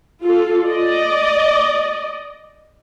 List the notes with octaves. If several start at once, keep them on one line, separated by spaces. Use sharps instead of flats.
F4 A4
D5 D#5